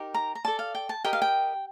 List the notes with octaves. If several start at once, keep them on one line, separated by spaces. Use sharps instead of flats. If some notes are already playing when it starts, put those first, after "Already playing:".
Already playing: D#4 G4 A#4
A#5
A#5
A4 D5 A5
F5
G5
A5
G4 A#4 D#5 G5
F5
G5